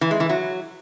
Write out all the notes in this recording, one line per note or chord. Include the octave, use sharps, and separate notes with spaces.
E3
G#3
E3
F#3